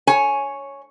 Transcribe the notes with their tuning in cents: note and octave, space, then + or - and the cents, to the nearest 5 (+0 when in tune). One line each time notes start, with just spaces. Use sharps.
C#5 +0 G#5 +10